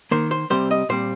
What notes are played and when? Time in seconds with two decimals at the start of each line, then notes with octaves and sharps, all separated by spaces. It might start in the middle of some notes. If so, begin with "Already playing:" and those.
0.11 D#3 A#3 C5
0.31 C5
0.50 C3 G3 C4 C5
0.71 D#5
0.89 A#2 G3 C4 C5